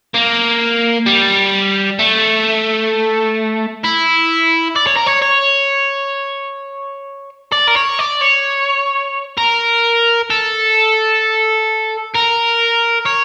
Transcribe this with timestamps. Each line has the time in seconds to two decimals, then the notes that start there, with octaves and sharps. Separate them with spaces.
0.15 A#3
1.06 G3
1.99 A3
3.84 E4
4.76 D5
4.87 C#5
4.97 A#4
5.07 C#5
5.22 C#5
7.52 D5
7.68 A#4
7.76 C#5
7.99 D5
8.22 C#5
9.37 A#4
10.30 A4
12.15 A#4
13.06 C#5